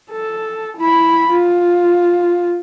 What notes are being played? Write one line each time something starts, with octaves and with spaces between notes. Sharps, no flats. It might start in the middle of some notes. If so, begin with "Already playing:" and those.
A4
E4 B5
F4